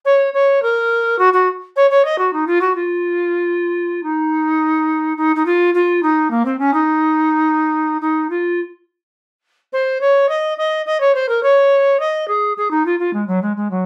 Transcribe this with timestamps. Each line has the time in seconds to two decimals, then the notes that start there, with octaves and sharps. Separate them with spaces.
0.05 C#5
0.33 C#5
0.62 A#4
1.18 F#4
1.33 F#4
1.76 C#5
1.90 C#5
2.04 D#5
2.18 F#4
2.33 D#4
2.46 F4
2.60 F#4
2.75 F4
4.03 D#4
5.17 D#4
5.35 D#4
5.45 F4
5.74 F4
6.02 D#4
6.30 A#3
6.45 C4
6.58 C#4
6.73 D#4
8.01 D#4
8.29 F4
9.72 C5
10.00 C#5
10.28 D#5
10.57 D#5
10.85 D#5
11.00 C#5
11.14 C5
11.28 A#4
11.42 C#5
11.99 D#5
12.27 G#4
12.57 G#4
12.70 D#4
12.85 F4
12.99 F4
13.13 G#3
13.27 F#3
13.41 G#3
13.56 G#3
13.70 F#3